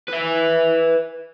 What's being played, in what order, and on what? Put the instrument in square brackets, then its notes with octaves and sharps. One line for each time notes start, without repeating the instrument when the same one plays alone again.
[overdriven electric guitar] B4 E5